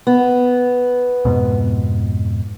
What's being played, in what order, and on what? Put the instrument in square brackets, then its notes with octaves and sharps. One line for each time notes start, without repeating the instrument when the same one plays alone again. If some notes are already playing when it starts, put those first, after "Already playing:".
[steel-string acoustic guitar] B3
[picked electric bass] F2 G#2 B2